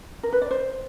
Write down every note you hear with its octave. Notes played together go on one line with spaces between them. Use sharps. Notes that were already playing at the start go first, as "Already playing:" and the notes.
A#4
B4
D5
C5